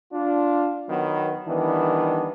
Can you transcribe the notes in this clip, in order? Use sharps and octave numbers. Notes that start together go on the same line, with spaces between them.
D4 F4
D#3 F#3 B3
D#3 E3 G3 B3 D4